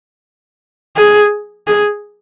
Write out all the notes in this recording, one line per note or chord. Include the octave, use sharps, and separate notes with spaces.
G#4
G#4